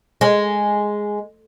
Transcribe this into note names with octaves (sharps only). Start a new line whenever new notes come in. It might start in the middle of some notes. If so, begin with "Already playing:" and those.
G#3